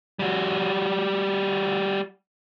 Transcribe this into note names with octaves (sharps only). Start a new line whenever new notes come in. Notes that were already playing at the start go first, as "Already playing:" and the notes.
G3 F#4